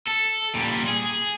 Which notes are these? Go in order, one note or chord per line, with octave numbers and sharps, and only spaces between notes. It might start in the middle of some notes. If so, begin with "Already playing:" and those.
A4
A#2 G3
G#4